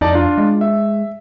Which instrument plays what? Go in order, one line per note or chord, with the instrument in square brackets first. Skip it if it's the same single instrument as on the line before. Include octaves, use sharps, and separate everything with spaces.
[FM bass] F2 [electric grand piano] D#4 D5 A5
[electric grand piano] D4 F4
[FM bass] G#3
[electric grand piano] E5